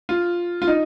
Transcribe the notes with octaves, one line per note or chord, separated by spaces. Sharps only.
F4
F4
D#4